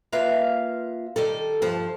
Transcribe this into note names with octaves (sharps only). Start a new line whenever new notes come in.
A#3 F4 B4 E5 F5
D#3 G3 A4
G2 F3 A5